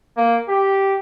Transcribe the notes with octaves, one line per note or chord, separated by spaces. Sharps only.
A#3
G4